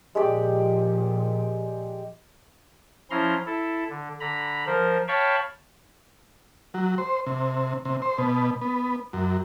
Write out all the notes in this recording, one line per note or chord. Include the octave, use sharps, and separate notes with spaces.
A#2 F3 G#3 G4 D5
F3 C#4 E4 A#5 C6
E4 A4
D3
D3 A#5 B5
F3 A#4 C5
C#5 F5 G5 A5 B5 C#6
F#3
C5
C3
C3
C5
B2
B3
F#2